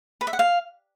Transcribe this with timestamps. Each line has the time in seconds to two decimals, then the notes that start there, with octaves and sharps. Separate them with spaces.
0.21 B4
0.27 E5
0.33 F#5
0.39 F5